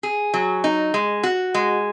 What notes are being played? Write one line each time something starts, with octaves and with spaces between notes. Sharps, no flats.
G#4
F#3
D#4
G#3
F#4
G#3